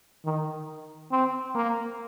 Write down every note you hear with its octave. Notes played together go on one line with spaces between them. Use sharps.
D#3
C4
A#3